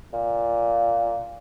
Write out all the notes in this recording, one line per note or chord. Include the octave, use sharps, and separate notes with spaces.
A#2